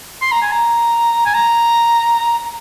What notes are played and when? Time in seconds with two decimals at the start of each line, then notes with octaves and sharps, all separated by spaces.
0.22 C6
0.32 A#5
0.42 G#5
0.52 A#5
1.26 G#5
1.34 A#5